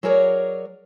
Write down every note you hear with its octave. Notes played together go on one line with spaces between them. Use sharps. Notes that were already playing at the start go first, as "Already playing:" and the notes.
F#3 F#4 G#4 A#4 C#5 D5